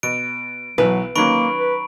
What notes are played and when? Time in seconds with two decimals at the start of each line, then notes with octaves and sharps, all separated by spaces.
0.03 B2 D7
0.78 B1 E3 F#3 B4
1.16 D#3 F#3 A#3 C#4 B5 C#6 D7
1.58 B4